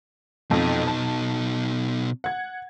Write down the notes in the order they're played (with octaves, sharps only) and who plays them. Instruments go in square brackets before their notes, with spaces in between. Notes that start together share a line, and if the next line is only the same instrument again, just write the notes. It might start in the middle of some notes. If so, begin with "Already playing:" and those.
[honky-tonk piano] F2 [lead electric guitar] B2 D#4
[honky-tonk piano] A5
F#5 G#6